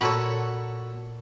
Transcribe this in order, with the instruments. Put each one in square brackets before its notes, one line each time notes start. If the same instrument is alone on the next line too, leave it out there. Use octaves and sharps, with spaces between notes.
[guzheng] A#2 B5 [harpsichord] F#4 A4 C#5